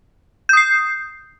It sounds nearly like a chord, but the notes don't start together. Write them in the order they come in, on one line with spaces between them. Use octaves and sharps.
G6 D#6 C7